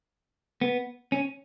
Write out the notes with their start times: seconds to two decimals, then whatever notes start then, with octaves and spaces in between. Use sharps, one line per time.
0.61 B3
1.12 C#4